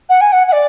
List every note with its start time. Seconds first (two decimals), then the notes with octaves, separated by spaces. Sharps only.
0.09 F#5
0.21 G#5
0.32 F#5
0.47 F#5
0.52 D5